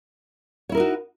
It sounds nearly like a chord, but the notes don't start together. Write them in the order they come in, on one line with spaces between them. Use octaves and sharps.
C#5 E4 A#4 D#4 F#4